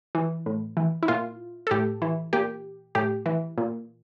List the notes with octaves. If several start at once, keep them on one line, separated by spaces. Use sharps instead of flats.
E3
A2
E3
E4
A#2 F4
A4
A2 G4
E3
A#2 G4
A2 G4
E3
A#2